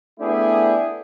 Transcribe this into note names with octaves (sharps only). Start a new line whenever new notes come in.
A3 B3 D4 E4 G4 G#4